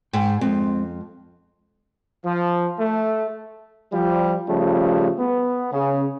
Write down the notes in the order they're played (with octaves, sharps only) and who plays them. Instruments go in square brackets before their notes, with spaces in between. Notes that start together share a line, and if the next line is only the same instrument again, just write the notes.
[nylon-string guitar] G#2 [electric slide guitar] G5
[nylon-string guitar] F2 [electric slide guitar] G#3 C4
[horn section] F3
A3
[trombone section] F3 G3
C#3 F3 G3 A3
B3
C#3